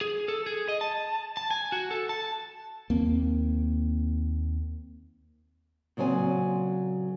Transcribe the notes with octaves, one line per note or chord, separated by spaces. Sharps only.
G#4
A4
G#4
D#5
A5
A5
G#5
F#4
A4
A5
D#2 A#3 C4
A#2 C#3 F#3 C4 G#5